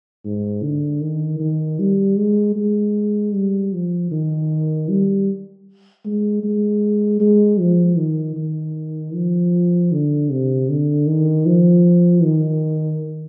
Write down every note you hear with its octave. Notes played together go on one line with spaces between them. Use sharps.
G#2
D3
D#3
D#3
G3
G#3
G#3
G3
F3
D#3
G3
G#3
G#3
G#3
F3
D#3
D#3
F3
D3
C3
D3
D#3
F3
D#3